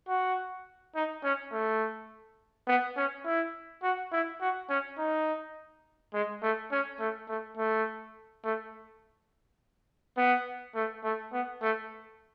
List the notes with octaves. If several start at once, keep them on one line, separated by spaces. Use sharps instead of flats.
F#4
D#4
C#4
A3
B3
C#4
E4
F#4
E4
F#4
C#4
D#4
G#3
A3
C#4
A3
A3
A3
A3
B3
A3
A3
B3
A3